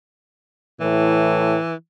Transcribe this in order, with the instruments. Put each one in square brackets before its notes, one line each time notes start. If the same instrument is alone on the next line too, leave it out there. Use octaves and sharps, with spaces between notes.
[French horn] A2 [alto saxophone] E3